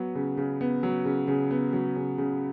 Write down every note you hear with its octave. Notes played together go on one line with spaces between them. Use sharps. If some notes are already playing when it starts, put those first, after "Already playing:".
Already playing: F#3 B3
C#3
C#3
B3
F#3
C#3
C#3
B3
F#3
C#3
C#3